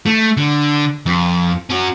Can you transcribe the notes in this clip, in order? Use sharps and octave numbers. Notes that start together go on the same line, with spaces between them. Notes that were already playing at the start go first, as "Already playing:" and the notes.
A3
D3
F2
C#4 F#4